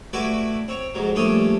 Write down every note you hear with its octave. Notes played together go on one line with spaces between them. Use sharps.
A3 E4 F#4 B4 D5
C4 C#5
F2 G#2 F#3
A#1 G2 A3 C#4 D4 D#6